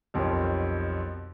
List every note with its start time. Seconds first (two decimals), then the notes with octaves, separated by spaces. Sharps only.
0.14 B1 F2 G3 A#4 C#5